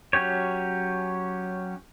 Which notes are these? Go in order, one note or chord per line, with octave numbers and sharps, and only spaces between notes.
F#3 C#4 G4 C#5